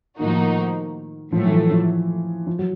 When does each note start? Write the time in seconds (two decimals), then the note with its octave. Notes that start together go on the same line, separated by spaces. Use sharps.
0.18 A2 D#3 F3 A#3 D#4 F#4
1.32 A2 F3 F#3 A3
1.46 E3
1.52 F3
1.71 F3
2.47 F3
2.59 F#3